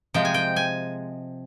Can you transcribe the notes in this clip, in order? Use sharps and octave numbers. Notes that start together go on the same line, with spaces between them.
C3 F3 G#3 G5
G#5
G5
G#5